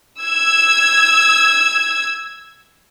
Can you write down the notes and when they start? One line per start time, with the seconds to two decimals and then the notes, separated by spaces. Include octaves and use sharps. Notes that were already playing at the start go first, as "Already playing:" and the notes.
0.22 E6 G#6